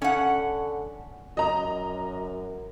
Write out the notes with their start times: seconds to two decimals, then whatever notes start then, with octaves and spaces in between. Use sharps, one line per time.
0.02 D3 C#4 F#5
1.37 F#2 D#5 A#5